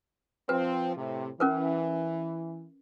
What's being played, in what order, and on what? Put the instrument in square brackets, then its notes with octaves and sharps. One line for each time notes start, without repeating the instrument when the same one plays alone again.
[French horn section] F3 C4 [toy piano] B4
[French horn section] A2 C3
[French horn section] E3 [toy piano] C#4 A#4 B4